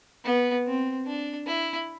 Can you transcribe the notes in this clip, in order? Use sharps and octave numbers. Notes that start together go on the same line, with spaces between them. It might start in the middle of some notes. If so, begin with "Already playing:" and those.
B3
C4
D4
E4